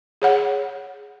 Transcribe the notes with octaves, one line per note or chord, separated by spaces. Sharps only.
G#4 C#5 F#5